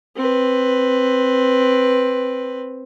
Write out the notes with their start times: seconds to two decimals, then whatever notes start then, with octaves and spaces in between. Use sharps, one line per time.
0.16 C4 B4